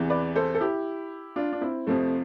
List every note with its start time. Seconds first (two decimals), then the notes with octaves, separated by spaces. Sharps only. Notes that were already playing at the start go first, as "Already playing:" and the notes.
Already playing: E2 C3 E3
0.10 B4 D5
0.36 A4 C5
0.55 A4
0.61 E4 G4
1.36 D4 F4
1.53 D4
1.61 C4 E4
1.87 F2 C3 F3 A3 C4